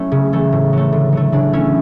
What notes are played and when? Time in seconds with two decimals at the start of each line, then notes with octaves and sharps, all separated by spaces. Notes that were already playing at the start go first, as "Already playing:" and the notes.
Already playing: F#3 A3 C#4 E4
0.12 C#3
0.33 E3 A3
0.52 A2
0.73 F#3 A3
0.92 D3
1.13 F#3 A3
1.32 C#3 D4
1.53 E3 A3 C#4 E4